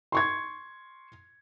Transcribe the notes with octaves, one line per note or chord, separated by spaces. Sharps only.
C6 C#6 G#6